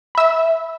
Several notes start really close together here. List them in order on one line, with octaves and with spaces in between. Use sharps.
B5 E5 E6